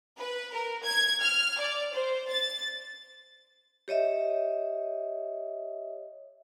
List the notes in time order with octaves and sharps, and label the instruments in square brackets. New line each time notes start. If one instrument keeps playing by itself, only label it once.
[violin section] B4
A#4
G#6
F6
D5
C5
A6
[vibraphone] G4 C#5 D#5 E5